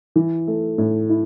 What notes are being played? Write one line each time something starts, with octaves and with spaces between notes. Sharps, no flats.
E3
A3
A2
E4